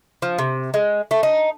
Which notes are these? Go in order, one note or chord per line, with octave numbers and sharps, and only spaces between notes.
F3
C3
G#3
A3
D#4